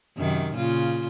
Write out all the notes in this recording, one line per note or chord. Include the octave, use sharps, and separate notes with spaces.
F#2 C3 D#3
A#2 C#3 F4